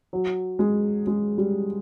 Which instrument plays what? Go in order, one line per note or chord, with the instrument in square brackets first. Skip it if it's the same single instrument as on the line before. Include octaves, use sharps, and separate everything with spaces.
[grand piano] F#3
G#3
G#3
G3